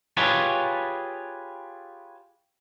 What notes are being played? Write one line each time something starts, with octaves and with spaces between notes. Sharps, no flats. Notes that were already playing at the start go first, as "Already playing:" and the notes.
F4 G4 G#4 B4 C#5 A5